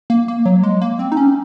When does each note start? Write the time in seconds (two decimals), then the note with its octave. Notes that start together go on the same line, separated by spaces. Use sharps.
0.10 A#3
0.28 A#3
0.46 F#3
0.63 G#3
0.82 A#3
0.99 C4
1.12 D#4
1.17 C#4